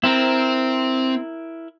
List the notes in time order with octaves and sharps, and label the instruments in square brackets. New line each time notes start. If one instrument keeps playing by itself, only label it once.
[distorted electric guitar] C4 [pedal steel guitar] E4 A#4 A#5